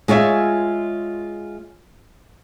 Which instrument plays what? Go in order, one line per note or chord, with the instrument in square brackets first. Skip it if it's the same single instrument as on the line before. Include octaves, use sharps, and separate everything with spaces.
[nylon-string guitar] G#3 F4 C#5 E5 G#5